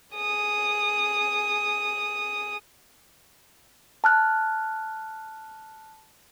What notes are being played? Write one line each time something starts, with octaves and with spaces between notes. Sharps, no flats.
G#4 D#6
A5 F6 F#6